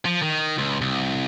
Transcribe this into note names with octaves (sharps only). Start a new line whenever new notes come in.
F3
D#3
C#2
C2